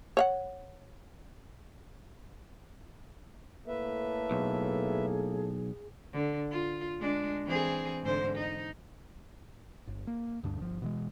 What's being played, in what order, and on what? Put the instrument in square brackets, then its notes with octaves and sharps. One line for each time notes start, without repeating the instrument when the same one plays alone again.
[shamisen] C#5 F5 F#5
[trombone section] A2 A#3 A4 [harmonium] B4 E5
[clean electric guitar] B1 [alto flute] G#4
[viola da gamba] D3
F4
G#3 D4
E3 C4 G#4
G#2 D3 C5
D#4
[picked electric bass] G1
A#3
D2 G2 D4
G1 F3
B2 E3 G#3